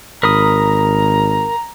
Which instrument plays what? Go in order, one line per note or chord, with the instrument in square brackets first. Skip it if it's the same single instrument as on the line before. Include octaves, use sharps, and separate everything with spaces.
[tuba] G#1 [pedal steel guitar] A#4 B5 D#6 [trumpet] A#5